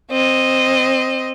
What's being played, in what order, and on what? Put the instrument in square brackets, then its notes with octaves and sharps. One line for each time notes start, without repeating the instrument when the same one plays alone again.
[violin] C4 D#5